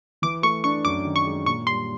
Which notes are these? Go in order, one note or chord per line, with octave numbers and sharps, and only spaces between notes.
E3 D6
A3 C#6
D4 C#6
F#2 D6
D#3
C#6
G#3
A#2 C#6
G3 C6